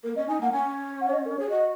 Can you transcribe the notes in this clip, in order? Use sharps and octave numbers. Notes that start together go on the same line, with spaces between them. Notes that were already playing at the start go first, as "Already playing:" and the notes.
A#3 A#4
C#4 D#5
D#4 G#5
A#3 F#5
C#4 G#5
F#5
C#5
D#5
A#4
G#4 C#5
F#4 D#5